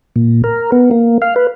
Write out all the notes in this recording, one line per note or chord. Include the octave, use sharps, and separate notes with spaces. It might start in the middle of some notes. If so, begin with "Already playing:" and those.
A#2
A#4
B3
A#3
F5
B4